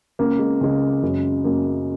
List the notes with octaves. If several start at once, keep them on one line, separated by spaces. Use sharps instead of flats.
C#2 C#3 A#3
G#3
C#2 C#3 G#3
F#1 F#2 C#3
F#1 F#2 C#3 A#3